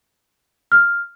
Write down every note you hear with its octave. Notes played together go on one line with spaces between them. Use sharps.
F6